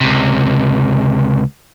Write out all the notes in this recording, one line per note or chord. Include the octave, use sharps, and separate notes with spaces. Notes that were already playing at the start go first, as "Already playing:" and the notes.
C#2 C3